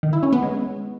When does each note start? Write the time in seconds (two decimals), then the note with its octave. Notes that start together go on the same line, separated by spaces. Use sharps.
0.03 D#3
0.13 E4
0.23 C#4
0.33 B3
0.42 G#3